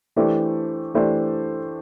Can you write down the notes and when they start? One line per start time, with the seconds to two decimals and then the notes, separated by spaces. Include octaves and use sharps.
0.16 E3 A3 D4 G4 C5
0.94 E3 A3 D4 G4 C5